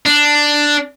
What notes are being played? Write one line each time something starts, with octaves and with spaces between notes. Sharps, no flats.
D4